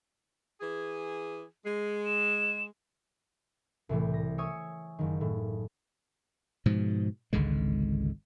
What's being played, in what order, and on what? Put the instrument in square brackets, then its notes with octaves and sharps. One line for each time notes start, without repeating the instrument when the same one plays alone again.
[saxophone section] E3 G#4
[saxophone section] G#3 [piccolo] C7
[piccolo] E7
[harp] C2 A2 E3
A#6
C#5 E5 G#5 C#6 D#6 G#6
F#1 D#3
A2
[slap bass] G#2 B2 F3
G#1 C#2 D3 G#3